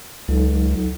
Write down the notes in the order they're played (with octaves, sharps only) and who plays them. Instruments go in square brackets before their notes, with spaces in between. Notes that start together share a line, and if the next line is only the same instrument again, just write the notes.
[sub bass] C#2 [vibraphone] F#3 D#4 A4